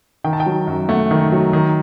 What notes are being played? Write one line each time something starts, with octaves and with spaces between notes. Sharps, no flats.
D#3 G5
A5
G5
F#3
F#2
A3 F#5
D#3
F#3
D#3